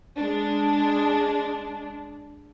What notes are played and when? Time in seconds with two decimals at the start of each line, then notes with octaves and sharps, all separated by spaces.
0.17 G#3 D4